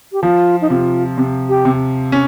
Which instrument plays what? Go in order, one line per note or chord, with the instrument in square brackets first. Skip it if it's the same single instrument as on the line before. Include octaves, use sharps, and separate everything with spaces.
[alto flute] G4
[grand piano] F3 [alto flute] F4
[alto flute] D#4
[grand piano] C3 [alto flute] F4
[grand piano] C3
[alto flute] G4
[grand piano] C3
C#4